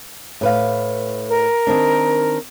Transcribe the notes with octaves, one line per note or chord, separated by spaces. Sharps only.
A2 B4 F5
A#4
D#3 C4 D4